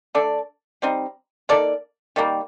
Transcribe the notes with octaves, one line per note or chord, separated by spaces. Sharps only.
A3 D4 A4 D5
G3 C4 D#4
A#3 D#4 A4 D5
D#3 G3 A#3